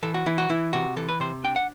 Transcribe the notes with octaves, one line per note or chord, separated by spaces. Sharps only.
E3 A4
F#4
E3 E4
F#4
E3 E4
C3 F#4
E3 A4
B4
C3 C5
D4 G5
F#5